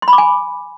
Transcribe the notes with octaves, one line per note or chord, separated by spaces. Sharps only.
C6
B5
D6
G#5